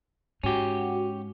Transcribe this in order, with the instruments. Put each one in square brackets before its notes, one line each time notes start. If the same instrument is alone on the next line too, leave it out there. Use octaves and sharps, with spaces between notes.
[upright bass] G#2 [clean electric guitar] C#4 G4 [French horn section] F#4